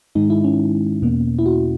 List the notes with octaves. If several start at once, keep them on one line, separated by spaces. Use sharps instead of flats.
G#2 D#3 G#3 D#4
E4
C#4
E2 B2 A#3
E4
F#4